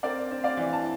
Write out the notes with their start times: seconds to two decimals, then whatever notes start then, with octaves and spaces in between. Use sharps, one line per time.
0.03 C4 A#4 D5
0.31 C4
0.44 D5 F5
0.57 E3
0.73 A5